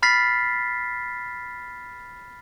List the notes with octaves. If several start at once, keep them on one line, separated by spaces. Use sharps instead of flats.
B5 F6 A6 B6 C7